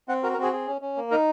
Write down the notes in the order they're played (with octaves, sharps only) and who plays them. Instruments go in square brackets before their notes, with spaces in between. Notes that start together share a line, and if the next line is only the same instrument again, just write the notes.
[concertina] C4 F#5
F#4 A#4
A#4
C4 G#4
G#4
C#4
C#4
A#3
D#4 A#4